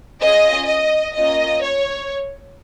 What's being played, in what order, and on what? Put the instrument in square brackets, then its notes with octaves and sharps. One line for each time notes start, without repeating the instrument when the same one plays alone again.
[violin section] C#4 F4 G#4 D#5
D#5
A#3 C#4 F4 D#5
C#5